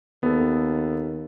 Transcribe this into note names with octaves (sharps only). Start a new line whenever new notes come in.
D#2 B3 A4